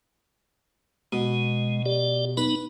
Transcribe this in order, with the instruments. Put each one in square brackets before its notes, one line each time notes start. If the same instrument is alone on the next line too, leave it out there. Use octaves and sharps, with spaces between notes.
[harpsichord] B2 [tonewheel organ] G#3
[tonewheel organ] G4 D5
[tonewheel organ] B3 D#4 [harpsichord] B4 B5